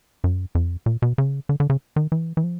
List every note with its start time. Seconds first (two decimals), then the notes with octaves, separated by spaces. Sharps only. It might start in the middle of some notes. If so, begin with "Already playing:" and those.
0.24 F#2
0.55 F2
0.86 A#2
1.02 B2
1.18 C#3
1.49 D3
1.60 D3
1.70 C#3
1.96 D#3
2.12 E3
2.37 E3
2.44 F3